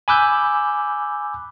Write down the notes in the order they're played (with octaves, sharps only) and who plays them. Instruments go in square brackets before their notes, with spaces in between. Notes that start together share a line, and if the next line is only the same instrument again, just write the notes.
[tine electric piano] G#5 B5 D6 E6 F#6 G6